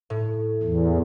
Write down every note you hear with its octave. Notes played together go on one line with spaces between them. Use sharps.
A2
E2